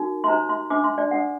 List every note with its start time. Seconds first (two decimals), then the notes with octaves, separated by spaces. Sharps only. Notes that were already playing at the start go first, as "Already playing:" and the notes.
Already playing: D#4 F#4 A#4
0.24 C6
0.28 D#4 G4 C5 A#5
0.49 C6
0.70 D4 A4 C5 D6
0.84 C6
0.98 D5
1.11 D4 A4 C5 F#5